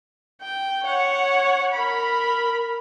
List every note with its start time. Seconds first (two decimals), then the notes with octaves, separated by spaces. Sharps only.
0.41 G5
0.85 C#5 F#5
1.72 A#4 B5